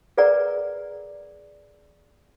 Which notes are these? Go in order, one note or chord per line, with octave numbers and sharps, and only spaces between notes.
G#4 A#4 B4 D5 F#5 A#5